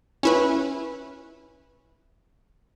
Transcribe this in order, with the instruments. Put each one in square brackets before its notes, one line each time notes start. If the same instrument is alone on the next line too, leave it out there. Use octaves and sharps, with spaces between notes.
[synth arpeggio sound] C#4 E4 B4